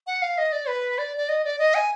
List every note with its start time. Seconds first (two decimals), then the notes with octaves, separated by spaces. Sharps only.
0.07 F#5
0.22 F5
0.38 D#5
0.52 D5
0.68 B4
0.98 D5
1.17 D5
1.29 D#5
1.45 D5
1.59 D#5
1.75 G#5